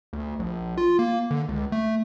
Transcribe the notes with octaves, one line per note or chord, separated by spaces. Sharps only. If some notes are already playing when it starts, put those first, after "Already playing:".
D2
A#1
F4
A#3
D3
C#2
A3